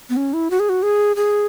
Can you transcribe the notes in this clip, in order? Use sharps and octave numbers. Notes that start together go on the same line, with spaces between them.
B3
C#4
E4
F#4
G#4
F#4
G#4
G#4